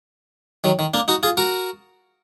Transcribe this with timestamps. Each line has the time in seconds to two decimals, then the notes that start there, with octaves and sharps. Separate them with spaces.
0.64 D#3 F#3
0.79 D#3
0.94 A#3 D4
1.08 D#4 F#4
1.23 F4 G#4
1.37 F#4 A#4